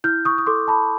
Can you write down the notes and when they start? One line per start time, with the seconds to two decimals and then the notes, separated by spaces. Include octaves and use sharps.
0.04 E4 F6 G6
0.25 C#6 D#6
0.38 D#6
0.46 A4 C6 D6
0.68 A5 B5